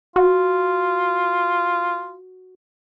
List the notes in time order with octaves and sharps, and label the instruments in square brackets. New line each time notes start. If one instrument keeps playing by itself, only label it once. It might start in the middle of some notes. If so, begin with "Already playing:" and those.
[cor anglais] F4 [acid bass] F#4